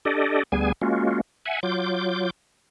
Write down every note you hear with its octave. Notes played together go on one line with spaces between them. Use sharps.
D4 G4 A4 D5 D#5
D2 G3 B3 G#4 G#5
G#3 A#3 C#4 F4 F#4
E5 F#5 G#5
F#3 F4 D6 G6